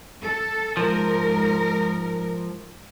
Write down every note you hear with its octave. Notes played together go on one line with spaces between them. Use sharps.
A4
G#2 F3 A#4